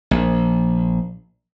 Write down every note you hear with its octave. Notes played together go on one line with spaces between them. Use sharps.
A#1